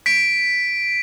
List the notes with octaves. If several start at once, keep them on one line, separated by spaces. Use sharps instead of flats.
B6 D7